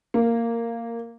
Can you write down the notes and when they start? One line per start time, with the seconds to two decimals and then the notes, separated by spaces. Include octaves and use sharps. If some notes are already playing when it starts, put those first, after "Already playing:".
0.14 A#3